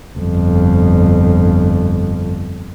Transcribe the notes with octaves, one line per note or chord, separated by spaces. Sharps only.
G1 F2